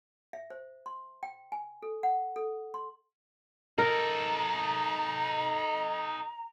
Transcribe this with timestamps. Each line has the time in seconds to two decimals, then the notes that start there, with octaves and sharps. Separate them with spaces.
0.33 E5
0.50 C5
0.86 C6
1.23 G5
1.52 G#5
1.82 A4
2.03 F#5
2.36 A4
2.74 C6
3.78 D#4 A4 A#4 A#5